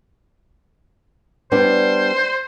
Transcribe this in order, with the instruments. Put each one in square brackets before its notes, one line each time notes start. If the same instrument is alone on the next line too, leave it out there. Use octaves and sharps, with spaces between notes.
[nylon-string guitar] G3 B3 D4 [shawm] C5